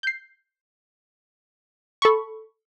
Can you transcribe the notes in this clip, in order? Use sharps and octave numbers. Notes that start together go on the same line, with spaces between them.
G6 C7
A4 B5 C#6